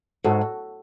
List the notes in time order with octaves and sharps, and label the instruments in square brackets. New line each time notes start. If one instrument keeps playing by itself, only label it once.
[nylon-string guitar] G#2 [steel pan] F#4 A4